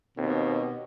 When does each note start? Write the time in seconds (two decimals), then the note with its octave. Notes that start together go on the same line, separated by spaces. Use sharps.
0.18 D#2 B2 C4